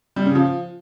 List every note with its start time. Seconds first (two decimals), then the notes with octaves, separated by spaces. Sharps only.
0.16 G3
0.26 C#3
0.35 F3